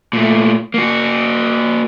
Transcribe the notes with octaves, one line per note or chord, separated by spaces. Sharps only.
A#2 A3
A#3 F#4